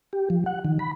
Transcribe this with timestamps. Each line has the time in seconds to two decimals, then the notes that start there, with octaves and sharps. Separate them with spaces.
0.13 G4
0.30 F3
0.46 F#5
0.65 D#3
0.79 B5